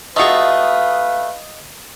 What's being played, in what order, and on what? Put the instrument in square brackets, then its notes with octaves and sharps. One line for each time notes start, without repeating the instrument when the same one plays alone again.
[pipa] A3 F#4 [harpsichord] D#4 F4 G#4 [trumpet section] B4 F5